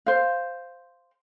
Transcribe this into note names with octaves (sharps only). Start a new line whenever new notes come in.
C5 F5